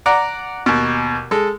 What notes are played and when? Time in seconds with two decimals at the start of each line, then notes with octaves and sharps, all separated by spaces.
0.06 D5 F#5 A#5
0.66 D#2 B2
1.31 G#3 A4